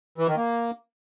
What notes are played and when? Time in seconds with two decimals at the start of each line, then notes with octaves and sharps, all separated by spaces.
0.18 E3
0.27 D#3
0.37 A#3